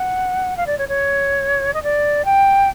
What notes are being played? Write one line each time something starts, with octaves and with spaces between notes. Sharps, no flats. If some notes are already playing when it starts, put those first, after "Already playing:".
Already playing: F#5
F5
D5
C#5
C#5
D#5
D5
G5